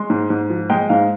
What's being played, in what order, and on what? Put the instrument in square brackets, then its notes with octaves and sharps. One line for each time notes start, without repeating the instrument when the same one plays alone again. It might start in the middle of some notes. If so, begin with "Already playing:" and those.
Already playing: [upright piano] G#3 C6
G#2
G#2
F3
G#3 G5
G#2 F5